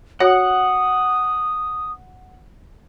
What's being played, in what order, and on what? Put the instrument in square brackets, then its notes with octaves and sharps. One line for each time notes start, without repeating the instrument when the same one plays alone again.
[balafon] F#4 C#5 [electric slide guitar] F#5 [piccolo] D#6